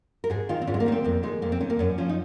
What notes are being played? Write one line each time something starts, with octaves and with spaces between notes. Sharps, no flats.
A#4
G#2 G#4
D#3 F4
C4
G#2 C#4
G#3
A#3
D#3 C#4
C4
F2 A#3
D#3 G#3
F2 A#3
C4
D#3 C#4
A#3
F#2 C#4
F3 C#4
D#4